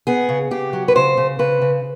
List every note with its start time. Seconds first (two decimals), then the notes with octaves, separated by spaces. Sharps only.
0.07 B3 G#4
0.29 C#3
0.51 C#3 G4
0.73 F#3
0.88 B4
0.95 C#3 C5
1.17 C#3
1.39 C#3 B4
1.62 C#3